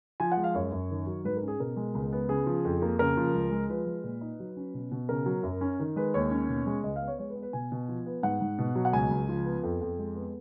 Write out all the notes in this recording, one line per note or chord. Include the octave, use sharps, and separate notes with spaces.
F3 G#5
F#5
G#3
F5
F#2 C#5
F#2
D#3
F#3
G#2 B4
A#4
C#4 G#4
B2 A#4
G#3
C#2
B3
C#3 G#4
F3
F2
A#3
C#3 A#4
F3
C#2
G#3
F3 B4
G#3
A#2
D#4
F#3
C#4
B2
B2
C#3 A#4
F#3
F#2
C#4
D#3
G#3 B4
D#2 C#5
C#4
B2
G#3
C#2 D#5
F5
B3
C#5
G#3 C#5
B4
B3
B4
B2 G#5
B2
F3
B3
G#2 F#5
G#2
B2
F#3
F#5
C#2 G#5
C#2
F3
B3
F2
F2
G#3
B3